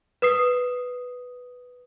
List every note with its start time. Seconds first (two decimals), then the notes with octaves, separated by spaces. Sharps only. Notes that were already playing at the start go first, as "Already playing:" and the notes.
0.22 B4 D#6 C7